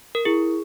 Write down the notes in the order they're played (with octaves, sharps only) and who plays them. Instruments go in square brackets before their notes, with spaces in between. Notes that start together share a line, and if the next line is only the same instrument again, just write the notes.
[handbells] A#4
[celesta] E4 [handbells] G#4